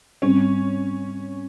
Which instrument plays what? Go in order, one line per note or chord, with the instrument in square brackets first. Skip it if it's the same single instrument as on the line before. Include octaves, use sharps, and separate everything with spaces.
[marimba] G#2 G3 C4 [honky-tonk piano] C#4